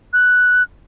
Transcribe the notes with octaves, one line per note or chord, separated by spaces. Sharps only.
F#6